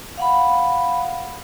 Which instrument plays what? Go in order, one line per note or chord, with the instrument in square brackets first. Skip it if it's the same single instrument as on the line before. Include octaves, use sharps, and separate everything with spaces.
[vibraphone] F5 F#5 B5